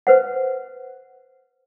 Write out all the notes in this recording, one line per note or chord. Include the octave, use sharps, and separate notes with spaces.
B4 C5 F#5